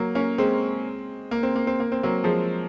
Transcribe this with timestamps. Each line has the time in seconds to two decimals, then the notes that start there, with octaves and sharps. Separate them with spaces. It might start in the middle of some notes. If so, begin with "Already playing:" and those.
Already playing: F#3 A#3
0.15 A#3 C#4
0.38 G#3 C4
1.31 A#3
1.43 C4
1.56 A#3
1.67 C4
1.80 A#3
1.92 C4
2.03 F#3 A#3
2.24 F3 G#3